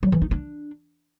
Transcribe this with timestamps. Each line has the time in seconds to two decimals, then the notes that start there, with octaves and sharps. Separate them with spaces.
0.03 F#3
0.12 E3
0.22 D#4
0.31 D4